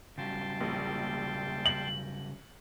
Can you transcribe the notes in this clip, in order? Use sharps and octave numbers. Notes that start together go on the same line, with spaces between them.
C#3 F#3 G3 G5 A5 C6
A#1
F#7